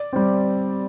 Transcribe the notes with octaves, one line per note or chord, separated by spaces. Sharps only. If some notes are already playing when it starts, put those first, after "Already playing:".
Already playing: D5
G3 C4